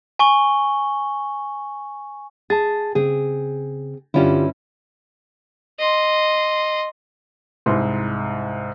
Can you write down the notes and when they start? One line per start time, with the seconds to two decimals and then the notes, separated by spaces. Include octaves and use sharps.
0.19 G#5 C#6 G7
2.50 G#4 A5 A6
2.95 C#3 C4 G#4
4.14 G2 D3 C#4 E4 F4 G4
5.79 D#5 C6
7.66 C2 G#2 E4 C6